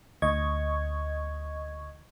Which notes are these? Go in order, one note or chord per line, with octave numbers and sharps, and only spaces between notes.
D2 D#5 C#6 G#6